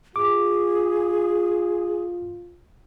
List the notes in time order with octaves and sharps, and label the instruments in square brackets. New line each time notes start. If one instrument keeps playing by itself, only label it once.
[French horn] F4 [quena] G#4 [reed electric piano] D6